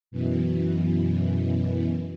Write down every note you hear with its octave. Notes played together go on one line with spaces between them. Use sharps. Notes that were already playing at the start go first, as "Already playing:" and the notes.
F#2 B2 E3